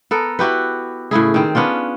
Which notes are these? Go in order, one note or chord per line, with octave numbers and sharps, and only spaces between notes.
B3 A4 A#4
E4 F#4 G4 B4
A2 C#3 E4 G#4
D#3 C4
B3 C#4 D4 F4